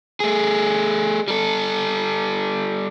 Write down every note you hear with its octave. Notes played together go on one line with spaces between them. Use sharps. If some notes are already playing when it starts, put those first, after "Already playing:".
A3 G#4
G3 A4